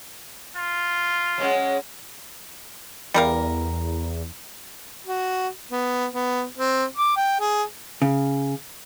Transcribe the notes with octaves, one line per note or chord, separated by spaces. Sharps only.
F4
F#3 G#3 C#4
E2 G3 A#4 F5
F#4
B3
B3
C4
D6
G5
G#4
C#3